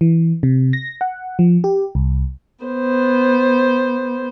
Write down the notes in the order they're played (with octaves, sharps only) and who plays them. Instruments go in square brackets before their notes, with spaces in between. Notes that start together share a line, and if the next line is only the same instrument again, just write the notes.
[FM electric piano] E3
C3
A#6
F#5
F3
G4
C2
[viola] B3 C5